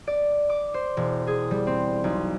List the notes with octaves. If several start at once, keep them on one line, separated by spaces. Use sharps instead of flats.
D5
D6
C5
E1
G#4
G3
C4
B1